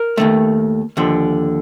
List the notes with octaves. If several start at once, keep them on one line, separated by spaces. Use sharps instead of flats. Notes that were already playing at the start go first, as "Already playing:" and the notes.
Already playing: A#4
D#2 D#3 A3
D#2 D3 F3